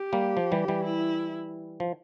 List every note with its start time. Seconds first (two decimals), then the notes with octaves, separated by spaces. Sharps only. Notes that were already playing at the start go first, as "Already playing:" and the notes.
Already playing: G4
0.13 G3 A#3
0.37 F3
0.52 E3 G3
0.68 E3 G3
0.84 E4
1.80 F3